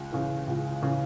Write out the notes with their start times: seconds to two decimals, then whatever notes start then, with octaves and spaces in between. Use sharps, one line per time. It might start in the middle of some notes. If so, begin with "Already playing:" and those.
Already playing: C#2
0.12 C#3 E3
0.47 C#2
0.82 C#3 E3